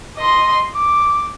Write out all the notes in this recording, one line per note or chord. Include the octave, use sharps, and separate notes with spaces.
D#5 C6
D6